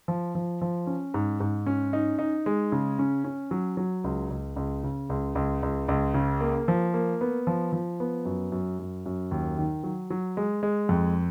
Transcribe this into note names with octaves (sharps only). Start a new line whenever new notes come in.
F3
F3
F3
C#4
G#2
G#2
C#4
D#4
D#4
G#3
C#3
C#4
C#4
F#3
F#3
C#2
C#2
C#2
C#3
C#2
C#2
C#2
C#2
C#3
A#3
F3
A#3
B3
F3
F3
B3
F#2
F#2
F#2
F#2
D#2
D#3
F#3
F#3
G#3
G#3
F2